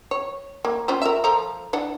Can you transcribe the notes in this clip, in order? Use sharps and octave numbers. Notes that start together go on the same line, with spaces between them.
C#5
A#3
C#4 F4 C5
A#4 E5
F3 A4 A#5
E3 D4 F#5